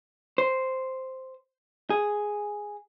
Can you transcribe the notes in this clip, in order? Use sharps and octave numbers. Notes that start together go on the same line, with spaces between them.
C5
G#4